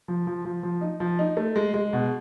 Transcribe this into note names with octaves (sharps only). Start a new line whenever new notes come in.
F3
F3
F3
F3
D#4
F3
D#4
A3
G#3
G#3
B2